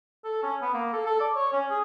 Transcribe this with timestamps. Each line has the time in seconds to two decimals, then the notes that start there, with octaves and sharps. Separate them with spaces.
0.24 A4
0.43 C#4
0.61 B3
0.74 A#3
0.93 A4
1.06 A4
1.20 D5
1.35 C#5
1.53 C#4
1.70 G#4